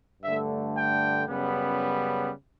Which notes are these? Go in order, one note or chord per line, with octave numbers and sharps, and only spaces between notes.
G2 D3 A3 E5
G5
F#2 C#3 G3 B3